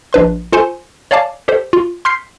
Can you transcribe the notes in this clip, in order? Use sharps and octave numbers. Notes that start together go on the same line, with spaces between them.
A#1 D4 B4 C6
F4 A4 C5 G#5 C6
C#5 D5 F5 G#5 A5 D6
G4 A4 C5
F4
C6 F6 G6 B6 C7